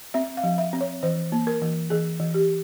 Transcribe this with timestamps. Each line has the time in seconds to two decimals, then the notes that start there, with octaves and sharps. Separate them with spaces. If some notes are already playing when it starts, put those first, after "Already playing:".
0.14 C4 E5
0.37 F5
0.43 F3
0.58 E5
0.73 C4
0.81 C#5
1.03 E3 C5
1.32 A#3
1.47 A#4
1.62 E3
1.90 E3 G#4
2.20 E3
2.34 G4